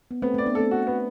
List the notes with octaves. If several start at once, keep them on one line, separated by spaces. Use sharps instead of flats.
B3
A3 B3 C4
A3 C4 D5
B3 D4
A3 C4 A4
F#4
B3